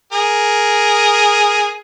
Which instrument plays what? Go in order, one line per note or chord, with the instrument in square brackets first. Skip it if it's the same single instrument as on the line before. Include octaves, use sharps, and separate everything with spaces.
[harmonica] G#4 A#4